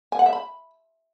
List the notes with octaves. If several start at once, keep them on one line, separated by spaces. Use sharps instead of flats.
G#5
F#5
E5
B5